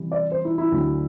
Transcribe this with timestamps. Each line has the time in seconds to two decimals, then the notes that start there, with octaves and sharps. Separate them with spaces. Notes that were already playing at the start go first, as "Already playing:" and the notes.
Already playing: C3 E3 G3
0.12 D5
0.32 C5
0.45 E4
0.58 E4
0.72 D2 D3 F#3